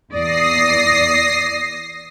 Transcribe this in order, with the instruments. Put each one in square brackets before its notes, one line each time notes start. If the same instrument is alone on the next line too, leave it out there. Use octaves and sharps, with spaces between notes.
[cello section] E2 D5 [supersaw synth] D#6 A#6 C7